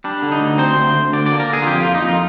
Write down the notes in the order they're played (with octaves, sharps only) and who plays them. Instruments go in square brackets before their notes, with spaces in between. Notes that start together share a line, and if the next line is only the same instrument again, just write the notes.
[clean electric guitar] G3 D4
D3
D#4
D2
C4 C5
D2
D2
D3 D5
D5
A#3
A#4
D3 G#4
F4
F2 G4
A#3 F4
D#4
F2
F4